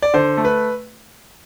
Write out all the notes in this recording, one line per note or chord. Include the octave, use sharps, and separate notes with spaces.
D5
D3 C5
A3
B4